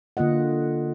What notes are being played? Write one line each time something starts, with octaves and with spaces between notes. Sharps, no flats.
D3 A#3 F4 D#5 F#5